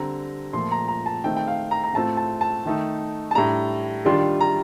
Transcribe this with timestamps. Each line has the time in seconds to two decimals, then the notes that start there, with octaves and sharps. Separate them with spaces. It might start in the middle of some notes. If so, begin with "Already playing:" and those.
Already playing: D3 G3 C4 A#5
0.53 A#2 F3 A3 C6
0.72 A#5
0.88 A#5
1.06 A5
1.24 D#3 A3 C4 D#4 G5
1.37 G5
1.48 F5
1.71 A#5
1.84 A#5
1.94 A2 A3 C4 F4 A5
2.17 A5
2.41 A5
2.65 D#3 A3 D#4
3.31 A5
3.35 A2 G3 D4 A#5
4.05 D#3 G3 D4 F4 C6
4.41 A#5